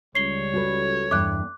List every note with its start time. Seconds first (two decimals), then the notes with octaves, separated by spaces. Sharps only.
0.15 C#2 G3 C#5 C7 G7
0.54 F#4 A4 B4
1.11 E2 G2 E5 D6 F#6